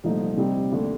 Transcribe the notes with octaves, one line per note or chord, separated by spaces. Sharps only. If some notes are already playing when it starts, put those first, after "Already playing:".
C2 A#2 F3 A3 D#4
C3 G3 C4 D#4
D#2 D3 A3